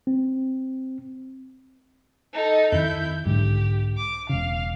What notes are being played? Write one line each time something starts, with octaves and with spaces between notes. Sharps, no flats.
C4
D#4 A4
F2 D#3 E4 G6
B1 G#2 D3 G4
D6
E1 C#3 F5